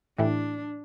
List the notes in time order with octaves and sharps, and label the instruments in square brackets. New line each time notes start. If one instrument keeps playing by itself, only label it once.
[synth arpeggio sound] A2 E3 A3 E4 G4 [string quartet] D4